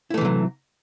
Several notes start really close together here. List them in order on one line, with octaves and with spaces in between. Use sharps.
E4 A3 E3 C3 F#3